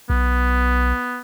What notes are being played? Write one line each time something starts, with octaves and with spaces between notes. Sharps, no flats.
B1 B3